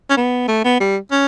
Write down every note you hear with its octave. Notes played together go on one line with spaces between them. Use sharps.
C#4
B3
A3
B3
G3
C#4